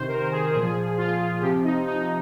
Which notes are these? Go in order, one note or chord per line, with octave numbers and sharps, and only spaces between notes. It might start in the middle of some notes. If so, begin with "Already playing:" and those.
Already playing: C3 D#3 C5
A#4
G#4
A#2 F3 G#4
F4
C3 F3 G4
D#4
D#4